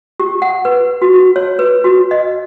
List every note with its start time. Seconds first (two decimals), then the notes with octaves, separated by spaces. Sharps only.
0.20 G4
0.42 F#5
0.65 B4
1.02 F#4
1.14 F#4
1.36 C#5
1.59 B4
1.84 F#4
2.11 D#5